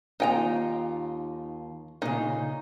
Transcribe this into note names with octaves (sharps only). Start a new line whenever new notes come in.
D#2 D#4 F4 G5 A#5
A#2 C#3 D#4